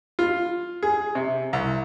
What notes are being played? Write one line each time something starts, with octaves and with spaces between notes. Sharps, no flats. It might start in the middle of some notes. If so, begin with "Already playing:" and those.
F4
G#4
C3
C2